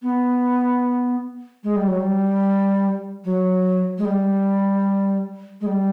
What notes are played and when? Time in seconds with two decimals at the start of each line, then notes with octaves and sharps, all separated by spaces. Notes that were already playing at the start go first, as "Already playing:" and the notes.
0.02 B3
1.64 G#3
1.76 G3
1.88 F#3
2.00 G3
3.25 F#3
3.98 G#3
4.05 G3
5.61 G#3
5.66 G3